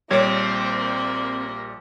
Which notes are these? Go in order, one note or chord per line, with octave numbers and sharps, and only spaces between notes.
A#1 G3 A#3 C4 C#5 D6